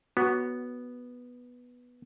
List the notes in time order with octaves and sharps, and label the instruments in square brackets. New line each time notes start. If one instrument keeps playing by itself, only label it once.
[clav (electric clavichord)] B3 [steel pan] F#4